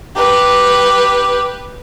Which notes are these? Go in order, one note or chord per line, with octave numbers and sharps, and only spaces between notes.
G4 B4